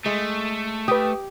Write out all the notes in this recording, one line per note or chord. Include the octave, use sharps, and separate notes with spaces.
G#3 A3
G4 B4 D#6